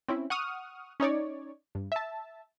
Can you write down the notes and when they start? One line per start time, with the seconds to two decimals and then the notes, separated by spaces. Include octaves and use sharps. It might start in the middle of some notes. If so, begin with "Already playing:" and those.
0.09 C4 C#4 E4
0.30 F#5 C#6 D#6 F6
1.00 C#4 D#4 C#5 D5
1.75 G2
1.92 E5 A5